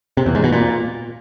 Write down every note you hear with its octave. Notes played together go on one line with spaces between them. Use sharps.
C3
E2
G#2
B2
A#2